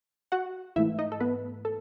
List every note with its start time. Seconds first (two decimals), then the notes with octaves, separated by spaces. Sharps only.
0.32 F#4 F#5
0.76 G#2 E3 A3 E4 E5
0.99 D#4 D#5
1.12 A4
1.20 B3 B4
1.65 A4